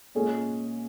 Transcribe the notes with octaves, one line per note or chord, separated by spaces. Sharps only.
A#2 G#3 C#4 G#4